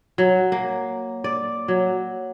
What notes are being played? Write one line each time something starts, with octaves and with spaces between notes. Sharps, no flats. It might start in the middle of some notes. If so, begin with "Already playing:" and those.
F#3
A#3
D5
F#3